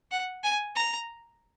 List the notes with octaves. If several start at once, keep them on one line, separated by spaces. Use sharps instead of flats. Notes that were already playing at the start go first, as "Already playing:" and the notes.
F#5
G#5
A#5